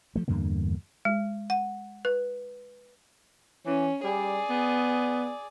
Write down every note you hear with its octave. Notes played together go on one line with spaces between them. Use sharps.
F3 A3
E2 G2 D3 A#3
G#3
F#5
B4
E3 C#4
G3 G#4 D5
B3